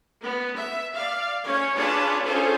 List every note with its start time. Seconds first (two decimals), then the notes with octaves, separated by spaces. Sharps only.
0.22 B3
0.55 E5
0.93 D5 F5
1.45 C#4 C#5
1.74 C#4 D4 F4 G#4 B4 A5
2.24 C#4 F4 G#4 A4 C5